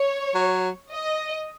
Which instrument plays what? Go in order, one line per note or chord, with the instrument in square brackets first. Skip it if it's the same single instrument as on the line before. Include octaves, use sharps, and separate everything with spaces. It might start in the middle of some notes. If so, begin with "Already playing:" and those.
Already playing: [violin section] C#5
[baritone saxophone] F#3
[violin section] D#5